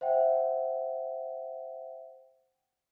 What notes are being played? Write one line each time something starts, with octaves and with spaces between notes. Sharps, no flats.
C5 E5 F#5 G5